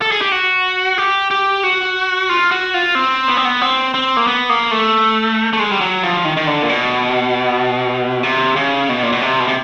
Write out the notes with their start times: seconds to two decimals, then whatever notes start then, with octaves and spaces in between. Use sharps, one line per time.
0.01 A4
0.11 G#4
0.21 G4
0.32 F#4
0.98 G4
1.31 G4
1.63 F#4
2.29 F4
2.51 F#4
2.74 F4
2.95 C4
3.28 B3
3.37 C4
3.45 B3
3.61 C4
3.94 C4
4.17 A#3
4.27 B3
4.49 A#3
4.71 A3
5.53 A3
5.59 G#3
5.71 G3
5.81 F#3
6.03 F3
6.25 D#3
6.37 D#3
6.47 D3
6.63 A#2
6.69 B2
8.23 C3
8.56 C#3
8.89 B2
9.03 A#2
9.12 B2
9.22 C3
9.40 B2
9.48 C3